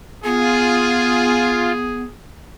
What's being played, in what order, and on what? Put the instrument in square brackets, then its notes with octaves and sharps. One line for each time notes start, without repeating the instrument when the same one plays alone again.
[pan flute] B3 [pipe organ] F4 [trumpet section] G#4